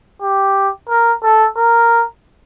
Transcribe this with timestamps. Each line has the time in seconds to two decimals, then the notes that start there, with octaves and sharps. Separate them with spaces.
0.22 G4
0.89 A#4
1.23 A4
1.56 A#4